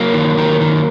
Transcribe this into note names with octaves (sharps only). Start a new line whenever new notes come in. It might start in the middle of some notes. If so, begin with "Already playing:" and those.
Already playing: F#3 A#3
D#3
D#3
D#3